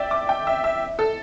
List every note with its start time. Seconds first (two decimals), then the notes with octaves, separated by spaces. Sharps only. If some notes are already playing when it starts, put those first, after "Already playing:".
Already playing: D5 E5 G5
0.11 D6
0.29 G5
0.47 E5
0.64 E5
0.99 A4